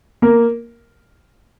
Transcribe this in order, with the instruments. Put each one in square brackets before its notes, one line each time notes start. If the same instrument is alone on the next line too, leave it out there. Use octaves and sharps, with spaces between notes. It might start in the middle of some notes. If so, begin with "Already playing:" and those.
[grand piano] A#3 A#4